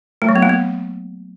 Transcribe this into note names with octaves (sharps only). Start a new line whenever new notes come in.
A3
F#3
B3
A#3
B3